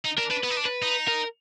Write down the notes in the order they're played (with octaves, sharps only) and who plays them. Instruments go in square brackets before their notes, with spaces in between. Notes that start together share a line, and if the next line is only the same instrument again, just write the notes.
[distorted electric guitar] D#4
[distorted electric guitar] D4 [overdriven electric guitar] A#4
[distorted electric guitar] D4 [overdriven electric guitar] B4
[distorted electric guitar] B3 [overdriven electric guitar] B4
[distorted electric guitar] D#4
D4
[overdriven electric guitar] B4
[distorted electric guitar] D#4
[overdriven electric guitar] A#4